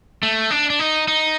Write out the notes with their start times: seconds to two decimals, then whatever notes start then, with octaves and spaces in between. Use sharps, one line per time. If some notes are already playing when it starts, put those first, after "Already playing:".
0.23 A3
0.51 D4
0.70 D4
0.79 D#4
1.08 D#4